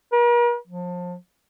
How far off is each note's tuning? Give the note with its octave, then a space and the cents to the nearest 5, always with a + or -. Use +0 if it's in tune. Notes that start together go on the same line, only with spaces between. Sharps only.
A#4 +45
F3 +30